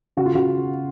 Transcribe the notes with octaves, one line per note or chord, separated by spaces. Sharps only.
C#3 F#4
F4
C#3 F#4